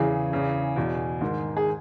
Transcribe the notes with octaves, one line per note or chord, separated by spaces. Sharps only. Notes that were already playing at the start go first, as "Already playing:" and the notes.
Already playing: E2 C#3 E3 G#4
E2 C#3 E3
E2 B2
G#2 D#3
G#4